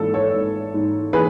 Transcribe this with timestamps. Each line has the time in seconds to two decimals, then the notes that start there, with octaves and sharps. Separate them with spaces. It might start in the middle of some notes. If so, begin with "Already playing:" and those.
Already playing: G#1 E3 A4
0.14 A4 C#5
0.34 G#1
0.74 G#2
1.13 E3 G#4 B4